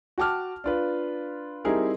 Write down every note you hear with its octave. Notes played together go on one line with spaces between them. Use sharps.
F#4 G5 A5 D6 F6
D4 F4 B4
G3 C4 D#4 E4 G#4 A#4